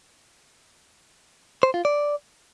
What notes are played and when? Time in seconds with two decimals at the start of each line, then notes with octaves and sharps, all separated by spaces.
1.63 C5
1.74 F4
1.85 D5